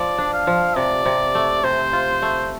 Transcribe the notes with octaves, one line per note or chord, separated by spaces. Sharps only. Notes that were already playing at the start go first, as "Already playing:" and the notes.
Already playing: F3 D5
D4
F5
F3
C3 D5
C3
A3
C3 C5
F4
A3